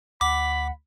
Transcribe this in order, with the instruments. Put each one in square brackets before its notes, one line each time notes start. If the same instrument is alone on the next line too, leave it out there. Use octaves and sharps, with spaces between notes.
[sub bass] D2 [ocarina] F#5 [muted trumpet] B5 [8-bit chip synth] D6